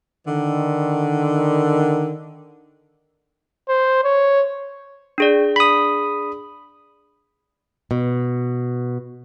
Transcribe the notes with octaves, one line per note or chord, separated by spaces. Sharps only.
D3 D#3
C5
C#5
D4 G#4 D5
B5 D#6
B2